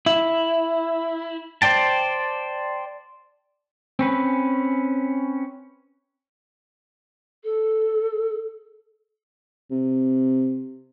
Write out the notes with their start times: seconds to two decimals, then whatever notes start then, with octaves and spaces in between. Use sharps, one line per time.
0.06 E4
1.62 C5 D5 G5 A5
3.99 C4 C#4 B4
7.44 A4
9.70 C3